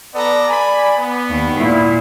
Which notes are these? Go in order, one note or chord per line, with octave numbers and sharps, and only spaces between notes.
B3 A4 D5 A#5
G#5 B5
B3
D#2
A#2 E4